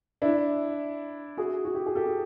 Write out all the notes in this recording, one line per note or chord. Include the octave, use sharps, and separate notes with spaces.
D4 E4
F#4 G#4
F#4
G4
G#4
G4 A4